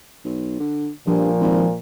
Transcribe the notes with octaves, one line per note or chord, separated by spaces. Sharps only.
B1
D3
G2 A#2 F3
G#1